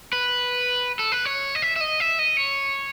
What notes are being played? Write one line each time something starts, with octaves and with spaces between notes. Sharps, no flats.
B4
A4
B4
C#5
D#5
E5
E5
D#5
E5
D#5
C#5